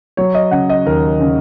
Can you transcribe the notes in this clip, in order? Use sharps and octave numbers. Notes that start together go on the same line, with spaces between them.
F#3 C#5
D#5
C#3 F#5
D#5
D#2 A#4
C#3